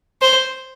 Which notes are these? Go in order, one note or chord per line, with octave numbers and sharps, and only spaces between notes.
C5